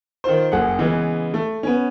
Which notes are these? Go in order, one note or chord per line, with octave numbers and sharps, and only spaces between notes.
D#3 F4 C5
F#1 G#4 F#5
C#3 E3 G#3 B3
A3
B3 C#4